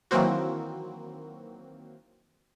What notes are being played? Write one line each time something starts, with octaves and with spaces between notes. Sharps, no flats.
D#3 E3 F#3 A#3 C4 F#4